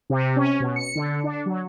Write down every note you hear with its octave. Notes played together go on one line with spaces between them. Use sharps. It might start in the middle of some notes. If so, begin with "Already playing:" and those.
C3
C#4
B2
C#7
D3
D4
F#3